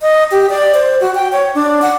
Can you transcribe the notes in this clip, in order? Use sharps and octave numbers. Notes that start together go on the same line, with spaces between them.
D#5
G4
D5
C5
F#4
G5
C#5
D4
F#5